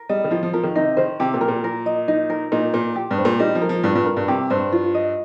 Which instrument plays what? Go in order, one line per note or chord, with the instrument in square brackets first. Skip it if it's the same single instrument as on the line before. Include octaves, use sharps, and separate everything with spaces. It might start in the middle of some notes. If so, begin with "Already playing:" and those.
Already playing: [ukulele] A#4
[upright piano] G3 [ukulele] D#5
[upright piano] D#3
[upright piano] F3 [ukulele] F4
[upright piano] F3
[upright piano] F3 [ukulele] A#4
[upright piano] D#3
[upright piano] C3 [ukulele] D#4
[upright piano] D#3 [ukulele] C5
[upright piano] C3 [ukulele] G4
[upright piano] A#2
[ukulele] A#4
[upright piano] A#2
[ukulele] A#4
D#5
D#4
A#4
[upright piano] A#2 [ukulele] D#4
[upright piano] A#2 [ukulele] A#4
[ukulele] G4
[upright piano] G2
[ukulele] C5
[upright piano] A#2
[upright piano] G3 [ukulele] D#4
[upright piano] F3
[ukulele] A#4
[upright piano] F3
[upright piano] G2 [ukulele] F4
[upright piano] G2
[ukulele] A#4
[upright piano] G2
[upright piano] C3 [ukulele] G4
[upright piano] G2 [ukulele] C5
[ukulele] F4
D#5